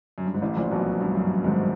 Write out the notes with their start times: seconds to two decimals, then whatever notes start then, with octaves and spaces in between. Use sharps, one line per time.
0.18 F#2
0.26 G2
0.34 G#2
0.42 A1 A2
0.57 A#1 A#2
0.71 B1 B2
1.00 G2
1.15 F#2
1.44 G#1 G#2